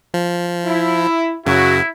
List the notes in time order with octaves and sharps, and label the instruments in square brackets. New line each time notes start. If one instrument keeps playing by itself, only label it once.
[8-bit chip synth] F3
[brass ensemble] E4
[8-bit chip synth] F#2 C#3 [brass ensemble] F#3 F#4 [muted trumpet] E4